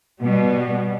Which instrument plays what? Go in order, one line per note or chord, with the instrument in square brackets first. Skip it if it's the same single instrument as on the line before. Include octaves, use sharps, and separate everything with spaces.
[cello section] B2 G3